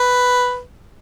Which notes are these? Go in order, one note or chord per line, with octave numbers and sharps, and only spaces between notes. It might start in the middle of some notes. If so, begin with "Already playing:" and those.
Already playing: B4